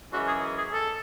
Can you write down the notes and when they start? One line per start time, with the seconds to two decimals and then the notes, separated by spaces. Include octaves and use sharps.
0.13 F#2 E3 G#3 C#4 F#4
0.28 G#4
0.58 G#4
0.73 A4